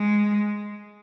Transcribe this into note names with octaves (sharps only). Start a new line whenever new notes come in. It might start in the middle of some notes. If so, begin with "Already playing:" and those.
Already playing: G#3